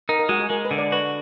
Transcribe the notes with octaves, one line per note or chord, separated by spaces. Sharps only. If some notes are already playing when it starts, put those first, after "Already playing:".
D#4 A#4
A#4
G#3 F#4
G#4
G#3 A#4
B4
D3
D5
F#4 B4